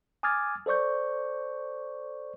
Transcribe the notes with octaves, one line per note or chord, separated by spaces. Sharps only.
G#5 D6 D#6 F6 G#6 A6
A4 C5 D5 C#6 G6